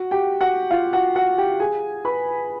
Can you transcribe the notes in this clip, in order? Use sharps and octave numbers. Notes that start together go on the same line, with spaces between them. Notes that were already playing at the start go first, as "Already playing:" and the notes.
Already playing: F#4 F#5
G4 G5
F#4 F#5
F4 F5
F#4 F#5
F#4 F#5
G4 G5
G#4 G#5
B4 B5